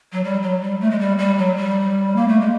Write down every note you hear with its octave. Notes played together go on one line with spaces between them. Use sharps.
F#3
G3
F#3
G3
A3
G#3
G3
G3
F#3
G3
A#3
A3
G#3